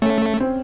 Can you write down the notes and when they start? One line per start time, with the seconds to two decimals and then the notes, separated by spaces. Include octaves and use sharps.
0.02 A3 C#4
0.40 C4